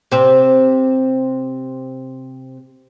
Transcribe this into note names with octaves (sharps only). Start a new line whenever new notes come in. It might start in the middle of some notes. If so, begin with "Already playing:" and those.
C3 C4